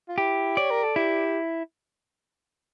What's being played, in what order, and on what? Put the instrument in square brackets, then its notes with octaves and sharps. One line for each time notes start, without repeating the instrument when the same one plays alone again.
[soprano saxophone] F4
[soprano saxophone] E4 [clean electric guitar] G4
[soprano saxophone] C#5 [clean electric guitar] D5
[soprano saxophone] A#4
A4
[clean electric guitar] E4 [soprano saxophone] G4